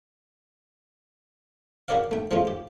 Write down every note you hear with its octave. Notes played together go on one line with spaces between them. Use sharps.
F#4 G4 A#4 C#5 D5 F5
A3 G5
F3 G#3 A3 C#4 F4
G4